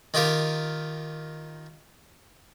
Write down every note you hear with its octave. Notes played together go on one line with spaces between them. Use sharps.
D#3 D#4 F4 G4 A#4